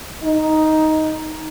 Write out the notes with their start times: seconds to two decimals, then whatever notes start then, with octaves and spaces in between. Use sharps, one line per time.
0.24 D#4